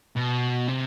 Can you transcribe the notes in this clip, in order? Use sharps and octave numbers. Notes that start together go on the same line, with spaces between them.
B2
C3